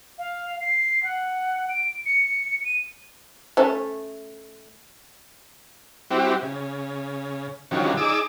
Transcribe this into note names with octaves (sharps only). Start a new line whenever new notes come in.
F5
C7
F#5
D7
C#7
D#7
A3 C#4
G3 C4 E4 F#4 G4
C#3
D3 D#3 F3 G3 C#4 F#4
D#4 G#4 D5 D6 E6